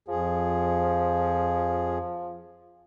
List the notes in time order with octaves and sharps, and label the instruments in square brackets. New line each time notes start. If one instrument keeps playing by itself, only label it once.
[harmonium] F2 G#4 [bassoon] F3